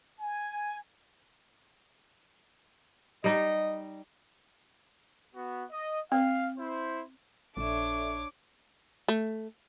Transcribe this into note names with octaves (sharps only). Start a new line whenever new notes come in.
G#5
G3 D#4 D#5
B3 F#4
D#5
C4 F5
E4 C5
A#1 D4 A4 C#5 D5 E5 D6
A3